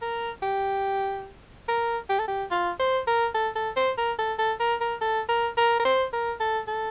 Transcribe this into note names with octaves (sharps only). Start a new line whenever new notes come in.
A#4
G4
A#4
G4
A4
G4
F4
C5
A#4
A4
A4
C5
A#4
A4
A4
A#4
A#4
A4
A#4
A#4
A#4
C5
A#4
A4
A4